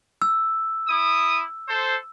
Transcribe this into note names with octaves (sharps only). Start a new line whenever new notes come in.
E6
E4 D#6
A4 C5